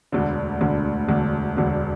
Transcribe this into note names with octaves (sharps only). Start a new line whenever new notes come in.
E1 D2 D3
E1 D2 D3
E1 D2 D3
E1 D2 D3